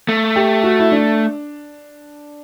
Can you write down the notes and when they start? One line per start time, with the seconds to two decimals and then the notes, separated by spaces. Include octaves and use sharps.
0.09 A3
0.36 G4
0.63 F#4
0.79 E4
0.92 D4